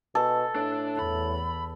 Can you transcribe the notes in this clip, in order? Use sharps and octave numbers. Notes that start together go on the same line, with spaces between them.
B2 A4
A2 D4
E2 B5